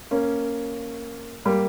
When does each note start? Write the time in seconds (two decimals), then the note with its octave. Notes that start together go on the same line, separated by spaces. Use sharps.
0.11 A#3 C#4
1.45 G3 A#3